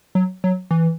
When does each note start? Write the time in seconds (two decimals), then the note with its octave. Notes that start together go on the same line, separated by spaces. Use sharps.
0.15 F#3
0.44 F#3
0.71 E3